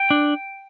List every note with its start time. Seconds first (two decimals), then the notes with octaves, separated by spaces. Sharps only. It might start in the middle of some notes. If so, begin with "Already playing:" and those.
Already playing: G5
0.10 D4